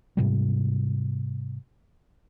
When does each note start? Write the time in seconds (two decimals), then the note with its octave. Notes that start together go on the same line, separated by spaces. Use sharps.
0.17 G#2 C3 G3